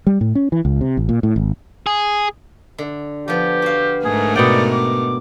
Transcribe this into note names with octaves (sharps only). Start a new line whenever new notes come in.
G3
A2
C#4
E3
C#2
C3
A1
A#2
A2
G#1
G#4
D3
F3 B3 G4
F#4 F5
G#2 A3 G#4 A#4
B2 D5 F#5 G5
D6